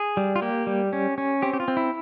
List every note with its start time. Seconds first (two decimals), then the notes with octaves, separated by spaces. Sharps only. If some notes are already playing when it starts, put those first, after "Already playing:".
Already playing: G#4
0.17 G3
0.36 F4
0.42 A#3 G4
0.67 G3
0.93 C#4
1.18 C#4
1.42 C4 G4
1.53 G4
1.60 F4
1.68 C4
1.77 E4